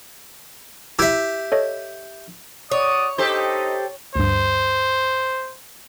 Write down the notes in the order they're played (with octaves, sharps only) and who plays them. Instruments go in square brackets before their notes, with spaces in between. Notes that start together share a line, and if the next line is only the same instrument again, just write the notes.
[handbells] E4 E6 G#6 [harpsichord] G4 E5
[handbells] A4 C#5 D#5
[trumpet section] F#4 D5 D#6 [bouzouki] C#5
[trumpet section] D#4 D#5 [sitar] G4 A4 C5
[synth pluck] D2 G2 [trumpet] C5